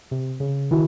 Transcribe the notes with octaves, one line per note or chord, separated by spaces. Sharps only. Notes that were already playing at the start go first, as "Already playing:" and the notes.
C3
C#3
D#3 E4 F#4